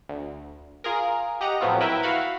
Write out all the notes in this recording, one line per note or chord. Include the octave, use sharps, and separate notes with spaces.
D2
F4 G#4 A#4
G4 D#5 F#5 A#5
A2 F3 F#3 B3 C4 F4
E4 A#4 B4 E5 G5
F#4 F5 F#5 B5